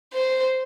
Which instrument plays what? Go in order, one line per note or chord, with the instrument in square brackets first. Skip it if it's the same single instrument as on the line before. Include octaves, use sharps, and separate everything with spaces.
[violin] C5